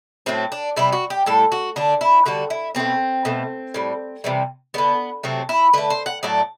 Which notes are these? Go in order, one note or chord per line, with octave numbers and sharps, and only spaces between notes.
A2 F#3 A3 C4
D4
C3 G3 E4
F#4
G4
A2 G3 A4
F#4
D3 A3 D4
E4
D3 G3 F#4
E4
B2 F#3 A3 C4
B2 A3
A2 G3
C3 E3 G3
D3 G3 B3
C3 F#3 A3 C4
E4
D3 A3 B4
C5
F#5
A2 F#3 A3 D5